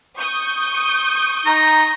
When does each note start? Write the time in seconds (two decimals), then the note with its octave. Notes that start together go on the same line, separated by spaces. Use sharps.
0.18 C#6 D#6 G6
1.46 D#4 A#5